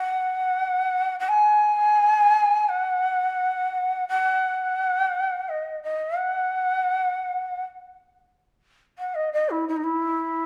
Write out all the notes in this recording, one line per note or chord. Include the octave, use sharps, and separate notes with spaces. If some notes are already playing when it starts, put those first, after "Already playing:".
Already playing: F#5
F#5
G#5
F#5
F#5
D#5
D#5
F#5
F#5
D#5
D#5
E4
E4
D#4
E4